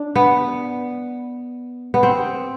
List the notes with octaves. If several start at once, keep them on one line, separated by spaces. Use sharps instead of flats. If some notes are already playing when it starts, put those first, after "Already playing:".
Already playing: D4
B3
B3
C4